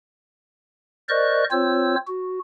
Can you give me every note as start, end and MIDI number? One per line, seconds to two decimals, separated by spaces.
1.09 1.44 70
1.09 1.44 72
1.09 1.44 74
1.09 1.44 75
1.09 1.44 85
1.09 1.44 90
1.51 1.95 60
1.51 1.95 65
1.51 1.95 72
1.51 1.95 73
1.51 1.95 88
2.08 2.39 66